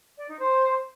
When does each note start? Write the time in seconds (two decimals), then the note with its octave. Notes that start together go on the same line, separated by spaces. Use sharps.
0.17 D5
0.28 D#4
0.39 C5